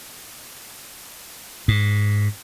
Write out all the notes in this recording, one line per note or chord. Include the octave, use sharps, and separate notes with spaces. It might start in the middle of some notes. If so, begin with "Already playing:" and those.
G#2